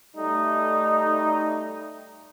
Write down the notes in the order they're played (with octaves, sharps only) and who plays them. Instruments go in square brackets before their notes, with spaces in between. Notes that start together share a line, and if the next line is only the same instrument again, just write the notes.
[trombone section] G3 A3 D#4